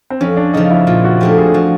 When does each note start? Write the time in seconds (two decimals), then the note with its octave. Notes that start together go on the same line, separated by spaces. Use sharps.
0.10 C4
0.21 F2 C#4
0.37 D4
0.54 C#3 F3 D#4
0.71 E4
0.87 A#2 F4
1.04 F#4
1.21 F3 A3 D4 G4
1.38 G#4
1.54 F3 F#4